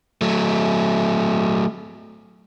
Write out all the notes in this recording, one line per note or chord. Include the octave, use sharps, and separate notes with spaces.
F#3 A3